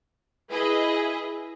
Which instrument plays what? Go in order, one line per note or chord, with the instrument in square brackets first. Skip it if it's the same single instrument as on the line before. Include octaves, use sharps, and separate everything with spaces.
[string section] E4 G#4 B4 D#5